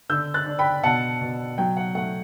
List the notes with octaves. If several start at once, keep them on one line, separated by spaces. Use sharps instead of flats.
D3 E6 G6
F#6 A6
D4
G5 B5
B2 F#5 A5
B2
F#3 G5
F#5
A3 F#5